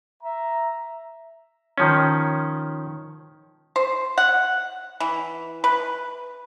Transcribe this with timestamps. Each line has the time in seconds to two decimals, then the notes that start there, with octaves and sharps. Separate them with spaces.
0.23 E5 A#5
1.78 D#3 F3 C#4
3.76 C5
4.18 F#5
5.00 E3
5.64 B4